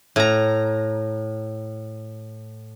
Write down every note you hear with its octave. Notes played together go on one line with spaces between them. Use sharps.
A2 A#5